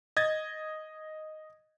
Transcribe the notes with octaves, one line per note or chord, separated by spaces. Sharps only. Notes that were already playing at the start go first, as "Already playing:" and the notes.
D#5 G#6 A6